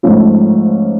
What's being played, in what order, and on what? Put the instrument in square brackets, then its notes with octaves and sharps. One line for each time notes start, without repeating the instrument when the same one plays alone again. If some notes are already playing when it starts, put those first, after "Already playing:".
[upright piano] G#2 F3 A3 C#4 F4